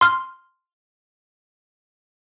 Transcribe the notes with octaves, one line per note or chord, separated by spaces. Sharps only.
C6 F6